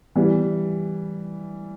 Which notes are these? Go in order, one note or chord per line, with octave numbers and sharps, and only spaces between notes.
E3 G3